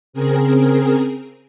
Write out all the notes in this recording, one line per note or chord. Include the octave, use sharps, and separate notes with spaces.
C#3 C4 G#4 A#4